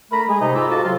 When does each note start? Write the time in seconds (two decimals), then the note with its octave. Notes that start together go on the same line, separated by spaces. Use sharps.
0.12 D3 A3 A#4 A#5 B5
0.28 G#3 G#4
0.40 C3 D#4
0.55 G#2 F4 A#5 D6 E6
0.70 F4 F#4 A4 D#5 A5 D6
0.84 C3 F#3 F4